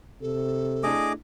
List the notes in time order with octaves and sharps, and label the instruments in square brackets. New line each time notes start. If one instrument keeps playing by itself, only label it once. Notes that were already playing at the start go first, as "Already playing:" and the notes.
[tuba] C3 [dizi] A4
[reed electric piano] A3 D4 E4 [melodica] G#4 D#5 D6